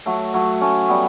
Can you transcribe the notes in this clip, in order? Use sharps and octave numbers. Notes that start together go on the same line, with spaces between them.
F#3 A3
F#3 A3
A3 C#4
G3 B3